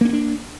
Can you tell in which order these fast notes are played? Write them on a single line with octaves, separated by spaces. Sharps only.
A#3 C#4 B3 D4